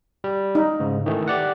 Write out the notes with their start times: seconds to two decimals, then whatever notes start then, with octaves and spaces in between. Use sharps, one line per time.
0.24 G3
0.55 D#4
0.80 G#2 C#3
1.06 D#3 E3 A3
1.28 G4 D5 F#5